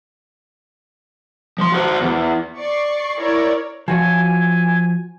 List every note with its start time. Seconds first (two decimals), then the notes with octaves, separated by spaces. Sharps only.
1.58 F3 C6
1.72 F#4 C5
2.01 E2
2.56 D5 C#6 C7
3.18 E4 A#4 C#5 D5
3.88 F3 F#4 C#5 G#5